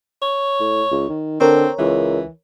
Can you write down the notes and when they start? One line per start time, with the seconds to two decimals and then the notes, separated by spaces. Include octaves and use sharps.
0.23 C#5
0.60 A2
0.91 C#2
1.09 D#3
1.41 D3 C4 A#4 C#5
1.79 C#2 E3